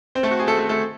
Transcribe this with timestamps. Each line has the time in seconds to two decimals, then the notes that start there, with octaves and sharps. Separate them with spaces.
0.15 C4 C5
0.23 A3 A4
0.31 F#4
0.40 G#4
0.47 A3 A4
0.58 A3 A4
0.69 A3 A4